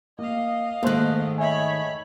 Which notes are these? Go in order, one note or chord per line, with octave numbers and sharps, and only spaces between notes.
A#3 D#5 F5
G#2 D#3 A3 A#3 C5 F#6
C#5 D#5 E5 G#5 B5